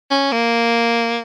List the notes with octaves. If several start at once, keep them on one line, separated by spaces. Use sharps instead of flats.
C#4
A#3